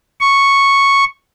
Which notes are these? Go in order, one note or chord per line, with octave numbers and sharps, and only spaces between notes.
C#6